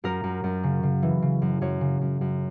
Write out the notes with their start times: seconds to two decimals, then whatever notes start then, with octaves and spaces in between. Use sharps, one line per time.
0.04 F#2 A#4
0.24 F#2
0.44 F#2
0.63 C#3
0.83 C#3
1.03 E3
1.22 C#3
1.42 F#2
1.61 F#2 C#5
1.81 C#3
2.01 F#2
2.21 F#2